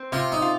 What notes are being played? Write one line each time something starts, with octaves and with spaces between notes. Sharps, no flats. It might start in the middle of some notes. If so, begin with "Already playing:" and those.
Already playing: C4
C3 F4
D#4
F4